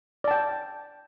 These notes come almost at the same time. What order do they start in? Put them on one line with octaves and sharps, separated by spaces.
D5 A5 G5